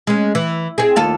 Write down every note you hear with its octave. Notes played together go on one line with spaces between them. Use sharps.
G#3 C#4
E3
C4 G#4
D#2 F4 A4